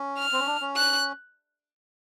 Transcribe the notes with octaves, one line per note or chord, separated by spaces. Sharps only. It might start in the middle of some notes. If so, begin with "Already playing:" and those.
Already playing: C#4
F6
C4
C#4
D4
C#4
F#6